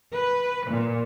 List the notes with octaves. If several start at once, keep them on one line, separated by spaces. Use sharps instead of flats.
B4
A#2